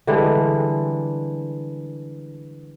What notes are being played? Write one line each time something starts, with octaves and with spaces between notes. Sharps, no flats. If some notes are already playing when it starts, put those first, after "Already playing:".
D3 E3 G3 G#3